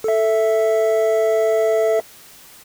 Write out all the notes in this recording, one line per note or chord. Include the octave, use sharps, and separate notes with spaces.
A4 E5